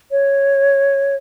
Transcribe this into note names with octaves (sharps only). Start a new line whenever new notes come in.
C#5